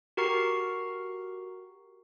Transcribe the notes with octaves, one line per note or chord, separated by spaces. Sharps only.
F#4 G4 A#4 A#5 C#6 C7